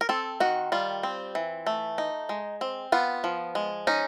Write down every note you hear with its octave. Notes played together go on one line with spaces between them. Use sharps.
A#4
C4 A4
D#3 F#4
G3 F4
C4
E3
A3
D#4
G#3
C4
B3 F4
F3
G#3
C#4 D#4